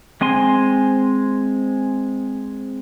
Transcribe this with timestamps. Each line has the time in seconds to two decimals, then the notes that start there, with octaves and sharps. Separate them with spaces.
0.21 G#3 C4 G#5 C6